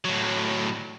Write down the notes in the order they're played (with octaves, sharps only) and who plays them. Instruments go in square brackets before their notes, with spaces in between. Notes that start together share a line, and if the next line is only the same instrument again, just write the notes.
[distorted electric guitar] A2 F#3